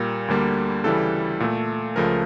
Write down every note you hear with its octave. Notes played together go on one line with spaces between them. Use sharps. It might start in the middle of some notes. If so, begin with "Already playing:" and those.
Already playing: A#2 G3 A#3 A#4
D2 D3 G3 A#3
D2 C#3 E3 G3 A4
A#2 A3
C#2 C#3 F3 A3 A#4